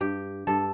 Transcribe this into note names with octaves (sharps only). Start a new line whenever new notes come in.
G2 G4
G2 A4